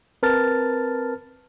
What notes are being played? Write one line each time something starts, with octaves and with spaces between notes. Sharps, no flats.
C4 A#4 B4 A5 F6 A6